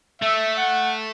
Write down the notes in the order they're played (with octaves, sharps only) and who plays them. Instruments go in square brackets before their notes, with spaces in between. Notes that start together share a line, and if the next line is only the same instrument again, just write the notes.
[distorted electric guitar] A3 [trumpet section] E5
[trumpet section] F#5